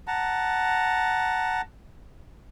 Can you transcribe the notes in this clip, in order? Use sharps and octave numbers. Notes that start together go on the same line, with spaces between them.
F#5 A5 A#5